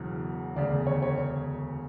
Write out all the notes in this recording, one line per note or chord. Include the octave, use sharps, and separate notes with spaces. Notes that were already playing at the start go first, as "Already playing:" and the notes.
Already playing: E1 E2 C#3 F#3
E1 D2 C#3 D5
C#5
C#5